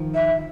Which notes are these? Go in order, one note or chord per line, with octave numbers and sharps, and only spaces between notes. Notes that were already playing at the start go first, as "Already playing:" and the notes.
Already playing: D#3 F3
E5